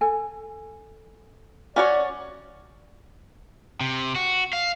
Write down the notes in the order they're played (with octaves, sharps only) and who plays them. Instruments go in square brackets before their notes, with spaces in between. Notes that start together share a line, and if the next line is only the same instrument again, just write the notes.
[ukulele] A4 G#5
[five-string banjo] C#4 F#4 C#5 [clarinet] D5
[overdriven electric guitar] C3
F#4
F5